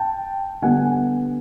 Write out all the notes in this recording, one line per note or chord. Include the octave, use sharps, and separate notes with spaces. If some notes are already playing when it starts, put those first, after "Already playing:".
Already playing: G5 A5
D3 G3 B3 D4 F#5 G#5